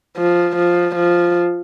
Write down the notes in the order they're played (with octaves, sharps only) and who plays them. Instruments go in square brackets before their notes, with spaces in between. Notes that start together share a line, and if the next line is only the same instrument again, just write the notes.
[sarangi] F3
F3
F3